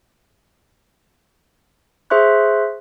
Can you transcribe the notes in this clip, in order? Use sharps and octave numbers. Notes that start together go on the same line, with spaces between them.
G#4 C5 E5 C6 C#6 F#6